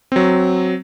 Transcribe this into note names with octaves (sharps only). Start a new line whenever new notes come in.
F#3 C4